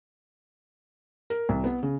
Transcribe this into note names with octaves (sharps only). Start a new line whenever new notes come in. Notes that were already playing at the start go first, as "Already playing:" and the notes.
A#4
C2
B3
C#3